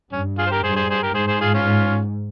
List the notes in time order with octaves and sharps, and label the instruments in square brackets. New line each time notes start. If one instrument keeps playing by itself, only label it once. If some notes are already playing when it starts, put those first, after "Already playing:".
[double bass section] G2 [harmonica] C#4
[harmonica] F4 G#4
C5
G4 A#4
[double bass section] G2 [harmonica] G#4 C5
[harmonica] G#4 C5
G#4 C5
G4 A#4
[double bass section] G#2 [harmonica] G#4 C5
[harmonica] G#4 C5
F4 G#4
C#4 F4